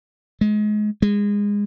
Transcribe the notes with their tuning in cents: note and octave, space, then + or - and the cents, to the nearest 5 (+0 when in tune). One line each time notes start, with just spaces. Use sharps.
G#3 +25
G#3 -25